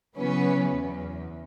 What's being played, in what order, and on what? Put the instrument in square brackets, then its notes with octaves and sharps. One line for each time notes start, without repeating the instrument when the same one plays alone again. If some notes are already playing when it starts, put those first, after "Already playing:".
[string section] C#3 E3 F#3 B3 C#4 B4
E2